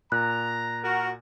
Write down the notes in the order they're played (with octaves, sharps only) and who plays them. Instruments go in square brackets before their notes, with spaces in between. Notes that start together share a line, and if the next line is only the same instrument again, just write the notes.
[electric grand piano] A#2 [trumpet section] A#5 [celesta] F#6
[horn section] F#4 A#4